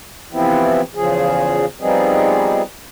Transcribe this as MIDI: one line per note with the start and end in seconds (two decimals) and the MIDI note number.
0.33 0.81 48
0.33 0.81 52
0.33 0.81 53
0.33 0.81 59
0.33 0.81 60
0.33 0.81 64
0.95 1.65 40
0.95 1.65 49
0.95 1.65 53
0.95 1.65 68
1.81 2.62 53
1.81 2.62 55
1.81 2.62 59
1.81 2.62 60
1.81 2.62 63
1.81 2.62 68